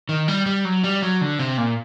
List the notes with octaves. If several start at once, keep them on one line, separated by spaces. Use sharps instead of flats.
D#3
G3
G3
F#3
G3
F#3
D3
C3
A#2